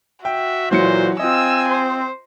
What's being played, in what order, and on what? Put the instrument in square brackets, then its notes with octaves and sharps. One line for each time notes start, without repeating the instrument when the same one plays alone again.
[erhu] F#4 [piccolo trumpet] E5 [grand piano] G5
[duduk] A#2 [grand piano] E3 F#3 C#7 [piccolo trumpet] C5
[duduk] C4 [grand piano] F4 D#5 [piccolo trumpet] G#5 [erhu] E6
[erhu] C5